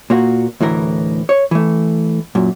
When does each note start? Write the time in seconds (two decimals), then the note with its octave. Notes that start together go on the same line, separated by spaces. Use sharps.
0.10 A#2 A#3 F#4
0.61 D2 A2 E3 A#4
1.29 C#5
1.51 E3 A3
2.35 F#2 A#2